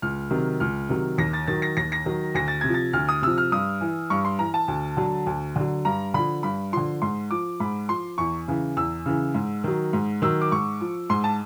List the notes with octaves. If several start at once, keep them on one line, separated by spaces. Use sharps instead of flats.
C#2 F6
C3 D#3 F#3
C#2 F6
C3 D#3 F#3
D#2 A#6
A6
D#3 F#3 A6
A#6
D#2 A#6
A#6
D#3 F#3
D2 A#6
A6
C3 G#6
F3
A6
D2 F6
D#6
C3 F3 E6
F6
G2 D#6
E3
G2 C#6
C6
E3 A#5
A5
D2
D3 F#3
D2
D3 F#3
G2 A#5
D3 F3 B5
G2 B5
D3 F3 C6
G#2 C6
F3 D6
G#2 B5
F3 C6
E2 C#6
C#3 E3
E2 E6
C#3 E3
G#2
D#3 F#3
G#2
D#3 F#3 E6
D6
G#2 C#6
F3
G#2 C6
A5